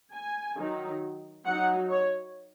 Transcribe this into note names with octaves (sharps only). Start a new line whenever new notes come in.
G#5
D#3 F#3 D#4
F#3 D#4 F#5
C#5